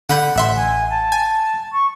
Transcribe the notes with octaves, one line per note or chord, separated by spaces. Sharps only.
D3 F#5 B5 G6
A1 E5 C6
G#5
A5
G#5
C#6